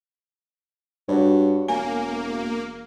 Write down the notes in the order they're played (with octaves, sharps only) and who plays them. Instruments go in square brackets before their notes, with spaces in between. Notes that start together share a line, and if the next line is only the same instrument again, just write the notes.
[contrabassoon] G2 [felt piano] F#4 C#5
[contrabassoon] E1 [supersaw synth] A#3 [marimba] G#5